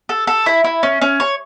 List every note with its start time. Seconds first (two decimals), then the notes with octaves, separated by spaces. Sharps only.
0.09 A4
0.27 A4
0.46 E4
0.64 E4
0.83 C#4
1.02 C#4
1.20 C#5